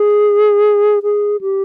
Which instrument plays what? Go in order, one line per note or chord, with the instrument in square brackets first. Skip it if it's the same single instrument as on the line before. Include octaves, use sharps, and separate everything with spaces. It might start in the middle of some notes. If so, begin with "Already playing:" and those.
Already playing: [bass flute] G#4
G#4
G4